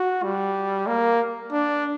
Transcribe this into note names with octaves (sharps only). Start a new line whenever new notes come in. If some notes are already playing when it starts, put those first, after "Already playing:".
Already playing: F#4
G3
A#3
D4